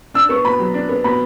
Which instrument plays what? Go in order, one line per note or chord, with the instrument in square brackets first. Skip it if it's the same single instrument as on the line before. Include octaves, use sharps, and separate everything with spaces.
[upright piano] D4 [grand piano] E6
[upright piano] B3 [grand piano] C#6
[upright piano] B2 [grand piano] B5
[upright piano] F#3
D4
B3
[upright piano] B2 [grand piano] B5